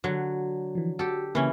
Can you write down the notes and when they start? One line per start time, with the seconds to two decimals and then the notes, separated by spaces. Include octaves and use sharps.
0.04 D3 F#3
0.75 E3 F3
0.99 F#4 G4 A4
1.35 C#3 E3 A#3 C#4